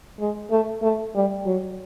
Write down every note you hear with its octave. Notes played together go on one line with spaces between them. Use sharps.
G#3
A3
A3
G3
F#3